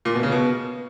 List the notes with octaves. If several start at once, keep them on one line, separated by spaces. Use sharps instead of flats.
A#2
B2
C#3
B2